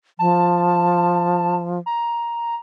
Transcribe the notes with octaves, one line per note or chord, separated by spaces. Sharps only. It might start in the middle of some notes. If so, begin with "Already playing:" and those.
F3 A5
A#5